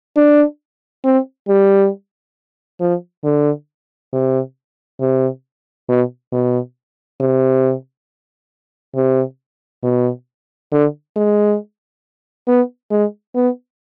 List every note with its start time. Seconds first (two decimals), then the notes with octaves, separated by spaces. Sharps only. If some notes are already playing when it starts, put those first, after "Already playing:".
0.16 D4
1.04 C4
1.48 G3
2.80 F3
3.24 D3
4.13 C3
5.01 C3
5.89 B2
6.32 B2
7.20 C3
8.95 C3
9.83 B2
10.72 D3
11.16 G#3
12.48 B3
12.91 G#3
13.35 B3